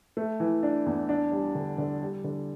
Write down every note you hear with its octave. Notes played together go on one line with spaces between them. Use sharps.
A3
E3
D4
E2
D4
G3
D3
D3
G3
D3